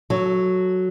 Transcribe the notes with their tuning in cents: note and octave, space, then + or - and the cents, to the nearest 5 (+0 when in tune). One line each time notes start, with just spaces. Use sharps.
F#3 +0 A4 +0